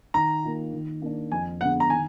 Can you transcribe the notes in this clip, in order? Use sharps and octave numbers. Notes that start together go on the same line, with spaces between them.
D#3 A#5
A#3 F4
D#3
A#3 D4
F2 G#5
D3 G#3 B3 F#5
A#5
D#3 G#5